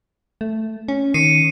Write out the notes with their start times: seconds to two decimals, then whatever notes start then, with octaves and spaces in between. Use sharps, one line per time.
0.41 A3
0.88 C#4
1.14 D#3 C7 C#7 D#7